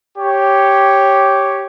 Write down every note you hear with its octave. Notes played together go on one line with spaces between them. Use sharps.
G4 C#5